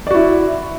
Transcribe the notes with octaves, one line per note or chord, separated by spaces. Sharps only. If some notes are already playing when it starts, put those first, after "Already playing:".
E4 F#4 D5